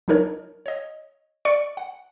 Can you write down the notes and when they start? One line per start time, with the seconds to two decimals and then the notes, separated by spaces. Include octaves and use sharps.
0.08 F#3 D4 D#4 A#4 C#5
0.66 C#5 D#5
1.45 D5 C#6 C#7 D7
1.77 F#5